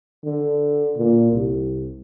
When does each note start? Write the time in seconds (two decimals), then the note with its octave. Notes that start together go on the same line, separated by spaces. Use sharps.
0.24 D3
0.97 A#2
1.32 C2